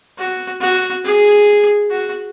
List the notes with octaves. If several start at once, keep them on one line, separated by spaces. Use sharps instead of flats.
F#4
F#4
G#4
F#4